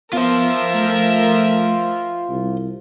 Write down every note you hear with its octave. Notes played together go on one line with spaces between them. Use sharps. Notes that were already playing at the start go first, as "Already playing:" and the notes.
B3 F4 A#4 C5 E5
A3
C2